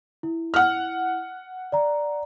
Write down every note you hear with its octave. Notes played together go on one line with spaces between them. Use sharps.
E4
F#5 F6
D5 A#5